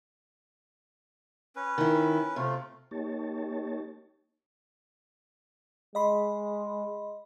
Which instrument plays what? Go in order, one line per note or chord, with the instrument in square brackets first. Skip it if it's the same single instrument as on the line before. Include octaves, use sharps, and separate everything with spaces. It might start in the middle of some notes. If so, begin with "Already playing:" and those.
[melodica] C#4 B4
[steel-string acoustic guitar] D#3 E4
[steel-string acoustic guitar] C3 [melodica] A3 F4
[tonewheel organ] A#3 D#4 G4 C#5 A5
[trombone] G#3 [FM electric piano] D#5 B5 C6